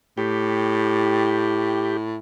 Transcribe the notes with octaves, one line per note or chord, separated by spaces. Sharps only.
A2 G4